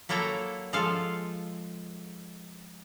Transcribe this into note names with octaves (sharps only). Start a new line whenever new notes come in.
F#3 A#3 E4 A4 G5 A#5
F3 G#3 F4 A4 F5